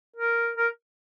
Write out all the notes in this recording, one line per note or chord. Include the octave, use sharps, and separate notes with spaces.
A#4
A#4